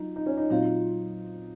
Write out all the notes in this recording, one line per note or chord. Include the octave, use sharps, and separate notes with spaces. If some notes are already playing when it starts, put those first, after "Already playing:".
Already playing: F#3 D#4 F4
D#4
C#4
D#4
A#2 F#3 C4 D#4 F4